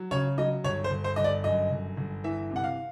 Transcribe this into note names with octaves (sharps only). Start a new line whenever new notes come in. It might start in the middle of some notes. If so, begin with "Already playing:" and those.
Already playing: F#3
C#3 C#5
F#3 D#5
G1 C#5
C5
G1
C5
G1 D#5
D5
F#2 D#5
G1
G1
E3 E5
C3
F#5
F5